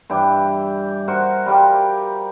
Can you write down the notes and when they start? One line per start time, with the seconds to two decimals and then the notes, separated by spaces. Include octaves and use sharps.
0.10 G2 E3 G4
1.08 F#4 A#4 C5
1.46 G3 F4 G4 A#4